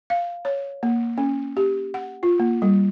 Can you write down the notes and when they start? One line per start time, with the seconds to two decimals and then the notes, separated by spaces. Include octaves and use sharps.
0.10 F5
0.45 C#5
0.83 A#3
1.18 C#4
1.57 G4
1.94 F#5
2.23 F4
2.40 A#3
2.62 G3